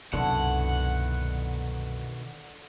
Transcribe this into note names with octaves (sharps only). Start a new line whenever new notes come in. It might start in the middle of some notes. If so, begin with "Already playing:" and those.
C2 F#2 B2 D3 D#3 E4 F#5